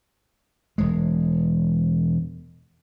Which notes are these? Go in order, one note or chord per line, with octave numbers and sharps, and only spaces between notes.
E1 G#3